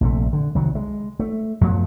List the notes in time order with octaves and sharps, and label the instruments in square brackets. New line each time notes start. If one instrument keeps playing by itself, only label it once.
[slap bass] A#1 C3 A3
D3
C2 D#3 F#3
G#3
A3
F#2 F3 A3 B3